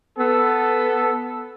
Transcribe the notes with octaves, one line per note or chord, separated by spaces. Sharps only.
B3 A4